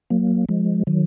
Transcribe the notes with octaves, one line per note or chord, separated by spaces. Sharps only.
F#3 A#3
F3 G#3
D#3 F#3